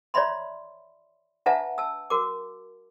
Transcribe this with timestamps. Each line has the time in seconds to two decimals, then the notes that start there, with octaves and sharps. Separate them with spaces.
0.14 F4 C#5 D5 E5 B5 C6
1.46 D4 F4 B4 E5 F#5 A5
1.78 A5 E6
2.10 F#4 A#4 D6